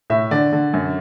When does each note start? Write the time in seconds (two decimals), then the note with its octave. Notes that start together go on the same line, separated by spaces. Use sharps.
0.10 A2 E5
0.31 D3 D5
0.52 D3
0.74 F#2